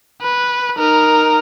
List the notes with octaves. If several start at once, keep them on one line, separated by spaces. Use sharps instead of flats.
B4
D#4 A#4